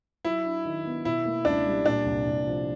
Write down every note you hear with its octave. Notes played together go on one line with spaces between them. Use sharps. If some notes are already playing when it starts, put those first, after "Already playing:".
F#3 E4
D4
D#3
B3
B2 E4
A#3
C#2 D4
G3
A#2 D4
C2
C2
F3